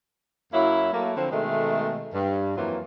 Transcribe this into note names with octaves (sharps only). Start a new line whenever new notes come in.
F#2 F#3 A#3 E4
F#3 A3 A#3
D3 F3 C4
B2 D#3 G#3 A3
G2
F2 E3 F#3 A#3 F4